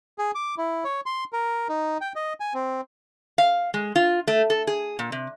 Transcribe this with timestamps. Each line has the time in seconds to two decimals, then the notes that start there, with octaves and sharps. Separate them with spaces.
0.18 G#4
0.35 D6
0.58 E4
0.84 C#5
1.06 C6
1.33 A#4
1.69 D#4
2.01 G5
2.15 D#5
2.40 G#5
2.54 C4
3.38 F5
3.74 G#3
3.96 F4
4.28 A3
4.50 A4
4.67 G#4
4.99 A#2
5.12 C3